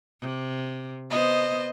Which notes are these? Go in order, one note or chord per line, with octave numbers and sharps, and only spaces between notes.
C3
B3 C5 D#5